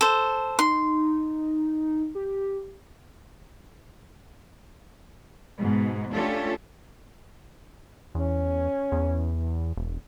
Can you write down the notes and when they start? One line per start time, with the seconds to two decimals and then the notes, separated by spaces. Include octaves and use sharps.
0.01 A4 C5
0.59 D#4 C6
2.15 G4
5.59 G#2 B2
6.13 A3 C#4 D4 F4 G4 A4
8.15 E2 C#4
8.92 E2
9.76 E1